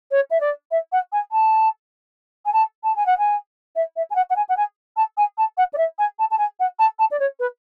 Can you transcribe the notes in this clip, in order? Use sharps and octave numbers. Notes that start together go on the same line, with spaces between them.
C#5
E5
D5
E5
F#5
G#5
A5
G#5
A5
A5
G#5
F#5
G#5
E5
E5
G#5
F#5
F#5
G#5
F#5
G#5
A5
G#5
A5
F#5
D5
E5
G#5
A5
A5
G#5
F#5
A5
A5
D5
C#5
B4